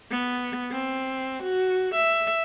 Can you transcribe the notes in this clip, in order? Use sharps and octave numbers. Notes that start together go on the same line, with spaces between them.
B3
C4
F#4
E5